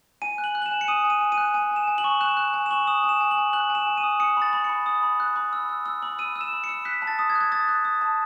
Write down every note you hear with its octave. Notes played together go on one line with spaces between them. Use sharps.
G#5 D#7
F#6
F#7
F#6
F#7
E7
G#5
C#7
D#6 D#7
G#5
D#7
G#5
D#7
F#6
G#5 D#7
G#5
E7
G#5
F#7
C#6
F#6 E7
F#6
G#5
E7
C#6 F#7
D#6 E7
G#5
E7
G#5
F#7
G#5
F#6 F#7
G#5
E7
G#5
D#7
D#6
D#6 C#7
B5 A6
B5
B5 C#7
D#6
B5
F#6
B5
E6
E6
E6
B5
E6 D#7
E6
E7
B5
C#7
E6
F#6 B6
A5
A6
D#6
G#6
F#6
G#6
D#6 A6
F#6
D#6
A5